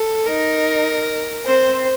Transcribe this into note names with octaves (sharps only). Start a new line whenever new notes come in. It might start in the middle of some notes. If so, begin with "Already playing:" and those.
Already playing: A4
D#4 A#4
C4 C5